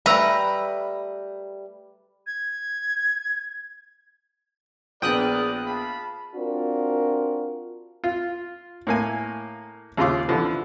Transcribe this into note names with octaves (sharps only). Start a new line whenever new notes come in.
G3 A3 B4 E5 A#5 E6
G#6
A#1 B3 G#4 A#4 D5 G5 D#6 F#6
F5 A5 B5
C4 D4 F4 F#4 A#4
F4
A2 A#3 G#5
D#2 C#3 F4 C6 D6
D3 E3 F3